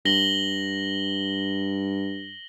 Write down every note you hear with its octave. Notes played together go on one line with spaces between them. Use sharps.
G2 A#6 F#7 G7